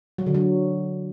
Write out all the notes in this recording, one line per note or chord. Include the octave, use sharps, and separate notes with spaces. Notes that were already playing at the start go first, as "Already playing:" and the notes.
F#3
D3
F#3